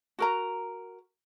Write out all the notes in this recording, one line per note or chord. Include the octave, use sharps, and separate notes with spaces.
F#4 A#4 A#5